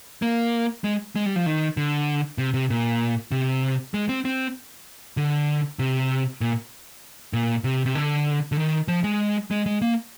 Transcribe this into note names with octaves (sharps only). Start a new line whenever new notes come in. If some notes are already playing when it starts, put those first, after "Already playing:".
A#3
G#3
G#3
G3
F3
D#3
D3
C3
C3
A#2
C3
G#3
C4
C4
D3
C3
A#2
A#2
C3
C3
D3
D3
D#3
F3
G#3
G#3
G#3
A#3